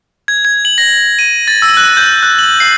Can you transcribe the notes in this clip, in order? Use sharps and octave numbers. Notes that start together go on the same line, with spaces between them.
G#6
G#6
F#7
A#6
D#7
A6
E6
F#6
G6
F#6
F#7
C7